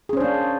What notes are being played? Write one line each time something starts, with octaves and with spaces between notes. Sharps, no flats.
A#3 C#4 D4 G#4 C5